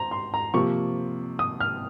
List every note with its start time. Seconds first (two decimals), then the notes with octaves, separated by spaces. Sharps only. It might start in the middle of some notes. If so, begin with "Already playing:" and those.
Already playing: C5 A#5
0.11 C6
0.34 A#5
0.54 C3 F3 A#3 C#6
1.39 D#6
1.60 F6